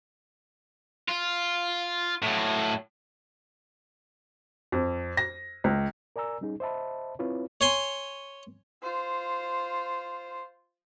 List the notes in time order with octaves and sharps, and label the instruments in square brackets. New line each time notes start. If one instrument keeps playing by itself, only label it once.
[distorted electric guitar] F4
A2 F#3
[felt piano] F2
A#6
C#2
[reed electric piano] A#4 D5 G#5 A#5 E6
G3 C#4 D#4 G#4
C5 D#5 E5 A5 B5
C4 E4 F4 B4 C#5
[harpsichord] C#5 G#5 C6
[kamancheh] F4 C5